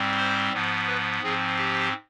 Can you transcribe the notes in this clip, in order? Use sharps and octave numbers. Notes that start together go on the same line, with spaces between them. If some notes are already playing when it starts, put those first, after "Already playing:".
Already playing: G#2 G3 C4
C5
G#2 F3 B3
B4
G#2 F3 C4 G#4
G4